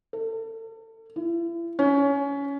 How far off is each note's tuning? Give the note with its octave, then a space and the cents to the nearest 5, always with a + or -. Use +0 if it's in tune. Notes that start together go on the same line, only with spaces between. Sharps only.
A4 +35
E4 +40
C#4 +20